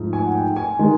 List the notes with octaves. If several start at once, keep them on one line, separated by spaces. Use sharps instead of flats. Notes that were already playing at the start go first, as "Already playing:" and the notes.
Already playing: G#2 F3 A3
G#5
F#5
G5
G#5
D#3 G#3